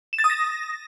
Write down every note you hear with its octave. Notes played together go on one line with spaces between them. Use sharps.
E7
A6
D#6
A#6